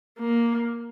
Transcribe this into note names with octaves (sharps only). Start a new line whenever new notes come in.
A#3